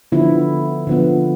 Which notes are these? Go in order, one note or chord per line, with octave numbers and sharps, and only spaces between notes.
D3 F3 B3 E4
D3 F3 B3